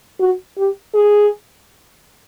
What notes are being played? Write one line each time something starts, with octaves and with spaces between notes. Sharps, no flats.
F#4
G4
G#4